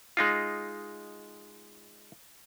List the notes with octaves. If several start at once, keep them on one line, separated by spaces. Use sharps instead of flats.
G#3 D#4 F4